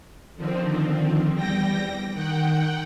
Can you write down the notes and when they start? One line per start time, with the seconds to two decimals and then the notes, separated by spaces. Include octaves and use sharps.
0.35 D3 D#3 F3 C4
1.32 E2 G3 G5 A#6
2.12 D#3 F#5 G5